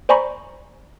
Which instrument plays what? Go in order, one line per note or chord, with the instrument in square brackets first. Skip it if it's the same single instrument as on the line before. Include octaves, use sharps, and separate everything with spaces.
[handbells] C5 D5 G#5 A#5 B5 C#6